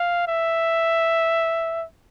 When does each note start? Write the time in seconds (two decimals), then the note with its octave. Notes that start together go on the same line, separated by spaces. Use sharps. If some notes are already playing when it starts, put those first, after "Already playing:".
Already playing: F5
0.28 E5